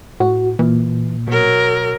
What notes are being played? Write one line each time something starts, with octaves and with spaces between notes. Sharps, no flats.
A2 F#4
A#2 E3
B2 F#3 A#4